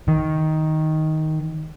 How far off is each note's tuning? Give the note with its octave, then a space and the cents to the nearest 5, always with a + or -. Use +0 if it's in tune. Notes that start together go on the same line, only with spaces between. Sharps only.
D#3 +10